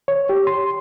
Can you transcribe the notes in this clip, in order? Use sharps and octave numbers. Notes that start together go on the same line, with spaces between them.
C#5
G4
C6